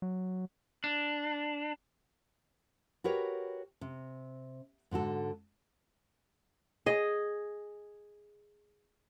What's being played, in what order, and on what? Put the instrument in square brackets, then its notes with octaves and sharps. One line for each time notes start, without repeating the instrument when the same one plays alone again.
[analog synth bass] F#3
[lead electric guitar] D4
[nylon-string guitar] F#4 G4 A#4 B4 C#5 G5
C3
G#2 D3 F#4 A4
[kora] G#4 D#5